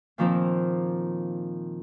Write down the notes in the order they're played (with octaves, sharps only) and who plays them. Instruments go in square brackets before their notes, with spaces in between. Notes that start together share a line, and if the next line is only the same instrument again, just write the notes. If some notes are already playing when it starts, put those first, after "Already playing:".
[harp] A#2 D#3 F3 A#3 C4